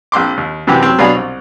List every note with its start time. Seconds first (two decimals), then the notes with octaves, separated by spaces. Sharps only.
0.12 A#1 C4 C6 D6
0.37 D#2
0.67 F#2 C3 E3 C4 G4 D6
0.83 F#3 C4
0.98 B2 F#3 D4 F5 G#5 B5
1.15 C2